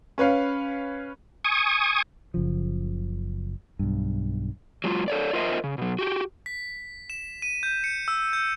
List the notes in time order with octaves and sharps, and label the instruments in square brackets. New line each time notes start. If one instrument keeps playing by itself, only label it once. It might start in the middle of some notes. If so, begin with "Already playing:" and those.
[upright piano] C#4 B4 C#5 F5
[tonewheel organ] G#5 C#6 D#6
[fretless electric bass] F#1 C#3 F3
B1 G2
[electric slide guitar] F#3 G#3 F4
A4 C#5 D5
F4 A#4 C5 D#5 E5
C#3
B2 F#3
F#4 G4
[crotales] B6
E7
D#7
G6
C#7
E6
G6